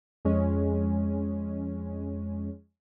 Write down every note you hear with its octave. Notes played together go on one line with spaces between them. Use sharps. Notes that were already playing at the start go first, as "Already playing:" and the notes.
F2 G#3 C#4